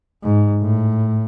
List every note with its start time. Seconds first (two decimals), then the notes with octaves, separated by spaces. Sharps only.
0.23 G#2
0.61 A2